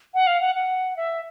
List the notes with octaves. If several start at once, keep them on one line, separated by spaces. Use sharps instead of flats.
F#5
F5
F#5
F#5
E5